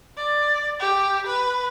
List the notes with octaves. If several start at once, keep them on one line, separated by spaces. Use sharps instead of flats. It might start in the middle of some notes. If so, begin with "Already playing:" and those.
D5
G4
B4